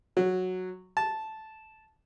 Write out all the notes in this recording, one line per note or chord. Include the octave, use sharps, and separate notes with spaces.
F#3
A5